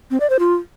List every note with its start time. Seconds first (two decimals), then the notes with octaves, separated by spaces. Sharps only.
0.11 C4
0.20 D5
0.30 C5
0.39 F4